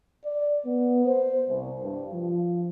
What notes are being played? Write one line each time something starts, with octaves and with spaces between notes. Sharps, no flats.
D5
B3
C5
C2
G2
F3